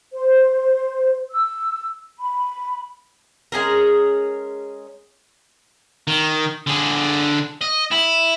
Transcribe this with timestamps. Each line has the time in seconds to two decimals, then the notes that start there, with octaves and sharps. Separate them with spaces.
0.13 C5
1.31 E6
2.19 B5
3.52 G#3 C#4 G#4 A#4
6.08 D#3
6.67 D3 G#4
7.62 D#5
7.91 E4